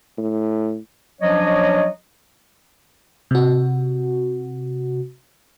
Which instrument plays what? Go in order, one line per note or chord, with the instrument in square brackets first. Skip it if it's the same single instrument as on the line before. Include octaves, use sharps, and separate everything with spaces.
[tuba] A2
[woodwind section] F3 F#3 C#4 D4 C#5 D#5
[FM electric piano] C3 F#4